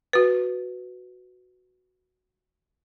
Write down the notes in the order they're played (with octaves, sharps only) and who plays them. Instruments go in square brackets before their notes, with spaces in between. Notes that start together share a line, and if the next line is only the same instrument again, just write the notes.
[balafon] F#4 B4